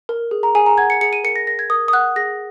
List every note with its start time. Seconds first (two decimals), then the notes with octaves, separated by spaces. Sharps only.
0.09 A#4
0.31 G#4
0.43 A#5
0.55 G#4 G#5
0.66 A#5
0.78 F#5 G#6
0.90 C#7
1.01 G#4 C#7
1.13 D#7
1.24 A#4 C#7
1.36 A#6
1.47 A#4 A#6
1.59 G#6
1.70 A#4 D#6
1.88 D#6
1.93 F#5 F#6
2.16 G#4 A#6